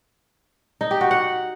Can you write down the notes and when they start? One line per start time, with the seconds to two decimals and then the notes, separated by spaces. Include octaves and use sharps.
0.81 D#4
0.91 G4
1.01 F#4
1.11 F#5